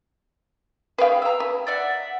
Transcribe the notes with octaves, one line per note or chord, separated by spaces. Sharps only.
G#4 B4 F5 G5
A#5 E6
B4
D5 E5 F#5